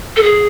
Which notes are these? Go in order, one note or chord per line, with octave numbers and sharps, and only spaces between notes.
A4
G#4